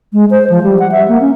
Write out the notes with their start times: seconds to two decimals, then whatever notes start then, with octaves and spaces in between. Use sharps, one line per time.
0.13 G#3
0.31 C5
0.50 F3
0.64 G3
0.80 F#5
0.92 E5
1.08 A#3
1.21 C#4